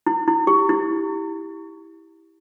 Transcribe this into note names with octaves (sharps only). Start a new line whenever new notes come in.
E4
E4
G4
E4